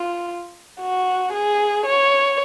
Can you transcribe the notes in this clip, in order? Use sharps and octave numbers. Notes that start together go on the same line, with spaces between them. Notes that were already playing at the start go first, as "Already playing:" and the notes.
Already playing: F4
F#4
G#4
C#5